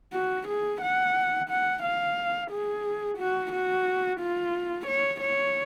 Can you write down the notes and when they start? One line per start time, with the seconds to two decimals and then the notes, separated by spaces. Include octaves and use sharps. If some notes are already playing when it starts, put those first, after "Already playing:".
0.13 F#4
0.47 G#4
0.81 F#5
1.50 F#5
1.83 F5
2.51 G#4
3.18 F#4
3.52 F#4
4.20 F4
4.87 C#5
5.21 C#5